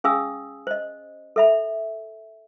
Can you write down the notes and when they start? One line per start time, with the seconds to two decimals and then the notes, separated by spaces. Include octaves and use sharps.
0.04 C#4 G#4 F5 G#5 D#6 E6
0.67 C5 D#5
1.36 A4 E5 B5